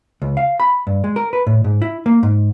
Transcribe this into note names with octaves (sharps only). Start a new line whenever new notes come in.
C#2
F5
B5
G2
G#3
A#4
B4
A2
G#2
E4
A#3
G#2